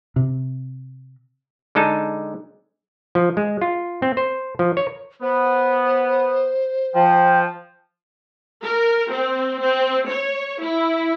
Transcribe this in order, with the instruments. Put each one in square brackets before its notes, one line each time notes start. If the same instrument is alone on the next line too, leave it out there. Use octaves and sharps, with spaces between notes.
[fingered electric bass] C3
[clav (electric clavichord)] D3 G#3 D#4 A5
F3
G#3
F4
C4
C5
F3
C#5
[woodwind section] B3 [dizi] C5
[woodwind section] F3 [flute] G5
[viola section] A#4
C4
C4
C#5
E4